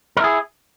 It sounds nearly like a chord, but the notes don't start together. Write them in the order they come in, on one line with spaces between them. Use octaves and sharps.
A#4 E4 G#4